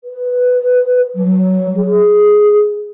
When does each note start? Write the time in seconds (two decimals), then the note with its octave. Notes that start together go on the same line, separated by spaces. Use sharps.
0.04 B4
1.15 F#3
1.77 G#4